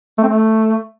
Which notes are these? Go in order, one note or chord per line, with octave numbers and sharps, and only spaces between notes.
A3
C4
A3